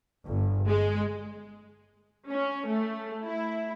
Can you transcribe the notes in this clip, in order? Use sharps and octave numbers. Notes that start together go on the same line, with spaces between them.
G1
G#3
C#4
A3
E4